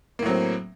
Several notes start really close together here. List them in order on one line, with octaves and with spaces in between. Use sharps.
A#3 A2 F#3 C4